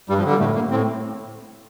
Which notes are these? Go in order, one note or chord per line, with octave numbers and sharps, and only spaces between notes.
G2 G3
F3
D3
G3
A2 A3
A#3
A2 C4